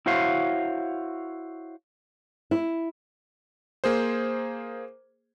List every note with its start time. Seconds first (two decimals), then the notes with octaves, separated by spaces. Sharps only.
0.06 E4 F#4 C5 C#5 F5
2.51 E4
3.84 A#3 G#4 C5